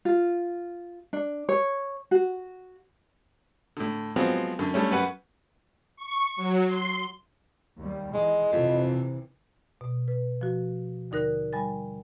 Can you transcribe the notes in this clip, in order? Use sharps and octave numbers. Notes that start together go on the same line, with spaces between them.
F4
D4
C#5
F#4
A2 D3
F3 F#3 G#3 B3 C4
F#2 D3
D3 G3 A3 C#4
F#2 B4 F#5
C#6
F#3
C6
D#2 G3
E3 G#3 D#5
F2 C3 E3
B2
B4
F3 F#4
D#2 D3 D#4 A#4 F#6 A#6
G3 G#5 B5 A6